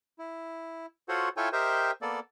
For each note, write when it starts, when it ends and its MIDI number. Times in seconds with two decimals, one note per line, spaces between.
0.19 0.86 64
1.09 1.29 65
1.09 1.29 66
1.09 1.29 69
1.09 1.29 72
1.09 1.29 73
1.09 1.29 78
1.37 1.49 64
1.37 1.49 65
1.37 1.49 69
1.37 1.49 73
1.37 1.49 79
1.37 1.49 80
1.53 1.91 67
1.53 1.91 70
1.53 1.91 72
1.53 1.91 75
1.53 1.91 76
1.53 1.91 79
2.02 2.20 58
2.02 2.20 59
2.02 2.20 69
2.02 2.20 74